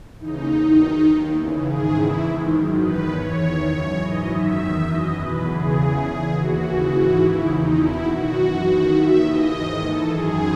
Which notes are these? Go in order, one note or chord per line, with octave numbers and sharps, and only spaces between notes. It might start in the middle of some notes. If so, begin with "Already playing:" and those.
D#2 C#3 E3 D#4
E2 D#3
F#2 D#3
D#2 D#3
E2 C#3 E3
G#2 D#3 G#4
E2 C#3 E3 E4
G#2 D#3
F#2 D#3
E2 D#3 B4
G#2 E3 C#5
E2 D#3
F#2 C#3 E3
G#2 E3 D#5
F#2 D#3 E5
E2 D#3
F#2 E3 D#5
E2 B2 B4
E2 C#3 E3 G#4
E2 C#3 E3
E2 D#3
D#2 C#3 E3 F#4
D#2 C#3 E3
G#2 E3
D#2 C#3 E3 E4
E2 D#3 D#4
E2 B2 E4
F#2 D#3 F#4
F#2 E3
D#2 D#3
D#2 D#3 E5
D#2 C#3 E3 D#5
G#2 D#3
G#2 E3 A4
F#2 D#3 G#4